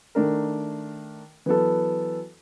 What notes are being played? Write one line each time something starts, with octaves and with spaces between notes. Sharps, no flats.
D#3 A3 D4 A#4
E3 F#3 B3 A4